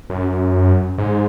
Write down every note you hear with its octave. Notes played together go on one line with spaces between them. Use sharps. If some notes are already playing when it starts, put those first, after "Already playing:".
F#2
G#2